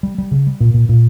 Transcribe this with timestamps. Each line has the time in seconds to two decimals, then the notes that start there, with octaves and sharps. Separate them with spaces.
0.03 G3
0.18 G3
0.31 C#3
0.47 G3
0.60 A#2
0.74 A#2
0.89 A#2